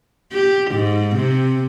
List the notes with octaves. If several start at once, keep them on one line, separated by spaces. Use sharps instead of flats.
G4
G#2
C3